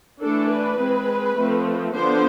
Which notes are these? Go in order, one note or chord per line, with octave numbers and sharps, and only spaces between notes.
E3 A3 D4 A4
B4
G#3 C4
F3 A3 C4
D3 F3 B3 D4 C5